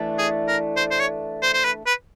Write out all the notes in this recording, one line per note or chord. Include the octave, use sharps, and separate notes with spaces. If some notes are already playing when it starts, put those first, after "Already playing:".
Already playing: E3 A3 D4
G#4
A#4
C5
C5
C#5
C5
C5
B4
B4